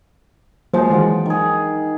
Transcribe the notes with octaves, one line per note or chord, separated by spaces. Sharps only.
F3 F#3 G#3 A#3 C5
D#3 E3 G#3 D5 F#5 G5
D#3 F3 G#4